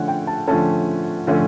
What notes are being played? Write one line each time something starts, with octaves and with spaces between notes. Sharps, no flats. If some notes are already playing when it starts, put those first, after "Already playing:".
Already playing: D3 F3 A3 C#4 F#5
G5
A5
D3 F3 A3 C#4 A5
D3 F3 A3 C#4